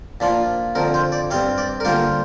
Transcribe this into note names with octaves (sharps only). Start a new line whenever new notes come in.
A#2 F3 D4 F4
F2 D3 F3 A#4
C5
D5
G2 G3 C4 F5
D5
A#4
D3 G3 A#3 F4 C5